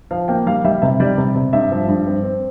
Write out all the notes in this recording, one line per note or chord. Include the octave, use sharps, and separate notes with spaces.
F3 F5
A#3 G5
G3 F5
G3 E5
C3 E5
G3 D5
C3
C3
G2 E5
F3
G2
C4
C4